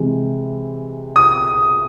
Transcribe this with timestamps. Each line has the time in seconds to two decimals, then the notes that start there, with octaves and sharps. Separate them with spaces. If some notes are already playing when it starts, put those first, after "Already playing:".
Already playing: C3 E3 G#3
1.16 D#6